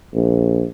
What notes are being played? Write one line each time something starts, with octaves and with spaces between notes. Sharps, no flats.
A#1